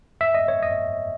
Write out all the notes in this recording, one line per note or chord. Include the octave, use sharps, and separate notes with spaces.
E5
D#5
C#5
D#5